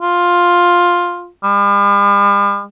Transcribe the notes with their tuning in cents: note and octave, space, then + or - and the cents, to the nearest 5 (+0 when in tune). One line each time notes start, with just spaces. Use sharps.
F4 +10
G3 +45